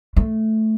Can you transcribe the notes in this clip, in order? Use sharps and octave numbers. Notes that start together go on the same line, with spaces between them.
A3